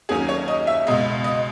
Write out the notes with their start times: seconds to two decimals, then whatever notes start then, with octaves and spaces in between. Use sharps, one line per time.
0.09 D#2 D#3 F#3 C#4 G#4
0.29 C#5
0.48 D#5
0.67 E5
0.87 C#2 B2 G#3 D#5
1.24 D#5